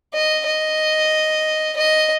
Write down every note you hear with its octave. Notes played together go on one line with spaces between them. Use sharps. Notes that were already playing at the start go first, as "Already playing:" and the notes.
D#5
D#5
D#5